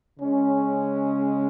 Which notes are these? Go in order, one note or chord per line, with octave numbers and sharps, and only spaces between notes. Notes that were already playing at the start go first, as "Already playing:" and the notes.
C#3 G#3 C#4